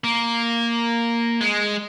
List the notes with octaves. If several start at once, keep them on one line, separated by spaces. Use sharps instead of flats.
A#3
G#3